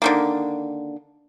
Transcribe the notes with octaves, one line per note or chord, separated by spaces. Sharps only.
D3 D#3 A#3